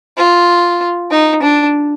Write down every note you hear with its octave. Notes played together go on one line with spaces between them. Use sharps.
F4
D#4
D4